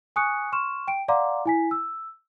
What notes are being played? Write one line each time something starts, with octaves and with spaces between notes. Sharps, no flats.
G#5 C#6 D#6 F#6 C#7
C6 C#6 F6 E7
G5 D7
D5 F5 F#5 A#5 C6 D6
E4 G#5 B6
E6